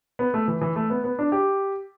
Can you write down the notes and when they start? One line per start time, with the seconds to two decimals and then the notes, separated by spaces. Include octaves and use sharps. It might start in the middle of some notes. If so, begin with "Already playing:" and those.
0.19 B3
0.34 A3
0.48 E3
0.61 E3
0.76 A3
0.90 B3
1.04 B3
1.19 D4
1.32 G4